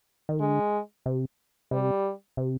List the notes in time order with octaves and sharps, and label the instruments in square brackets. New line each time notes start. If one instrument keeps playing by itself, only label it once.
[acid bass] D#3
[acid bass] D3 [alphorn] G#3
[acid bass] C3
[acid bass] C3 [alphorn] G3
[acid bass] C3